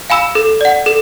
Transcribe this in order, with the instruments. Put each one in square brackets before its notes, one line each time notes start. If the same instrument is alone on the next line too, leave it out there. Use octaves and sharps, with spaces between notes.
[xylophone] F5 G#5 B5 E6
A4
D5 F#5
A4